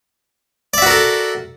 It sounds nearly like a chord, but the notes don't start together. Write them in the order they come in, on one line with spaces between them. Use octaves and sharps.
D5 E5 F#4 A#4 A4